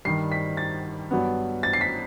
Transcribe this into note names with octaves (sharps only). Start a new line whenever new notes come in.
G2 D#3 G3 C7
B6
A6
G2 F#3 B3
A6
C7
B6